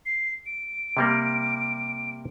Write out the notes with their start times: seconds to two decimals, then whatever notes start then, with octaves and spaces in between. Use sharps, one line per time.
0.06 C7
0.46 D7
0.97 C3 G3 A#3